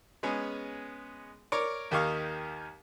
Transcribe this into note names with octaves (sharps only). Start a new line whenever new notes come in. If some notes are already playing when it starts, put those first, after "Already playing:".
G#3 B3 C#4 G#4
A#4 C#5 D5
D#2 D#3 G4 D#5 F5 C#6